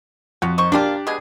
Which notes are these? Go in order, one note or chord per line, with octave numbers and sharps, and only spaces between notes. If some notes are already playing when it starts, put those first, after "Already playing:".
F2 F#4 C#5
D#3 C5 C#6
F3 A#3 D4 F4 G4
B2 G#3 G#4